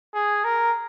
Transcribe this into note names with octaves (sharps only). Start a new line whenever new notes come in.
G#4
A#4